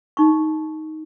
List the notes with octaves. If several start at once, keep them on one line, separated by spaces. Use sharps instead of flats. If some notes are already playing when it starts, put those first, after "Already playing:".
D#4 C#6